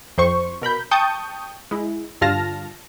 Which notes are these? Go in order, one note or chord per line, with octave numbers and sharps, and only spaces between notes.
F2 C5 C#6
B2 A#4 B5 G6
G5 A5 C#6 D#6 G6
G#3 E4
G2 D3 F4 A5 F6 A#6